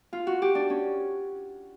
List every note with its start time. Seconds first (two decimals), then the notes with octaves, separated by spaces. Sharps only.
0.13 F4
0.27 F#4
0.42 G4
0.55 D4
0.70 C#4